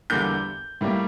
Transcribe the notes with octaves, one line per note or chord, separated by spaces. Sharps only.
E2 D3 G3 A#3 G6
A2 G3 A#3